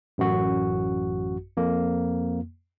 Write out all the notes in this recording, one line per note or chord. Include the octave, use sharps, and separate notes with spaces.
A1 F#2 F#4
F2 A#3